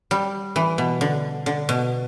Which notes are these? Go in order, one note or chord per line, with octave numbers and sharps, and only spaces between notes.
G3
E3
B2
D3
D3
B2